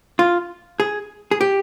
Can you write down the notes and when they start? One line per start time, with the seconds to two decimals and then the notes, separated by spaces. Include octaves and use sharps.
0.19 F4
0.80 G#4
1.31 G#4
1.41 G4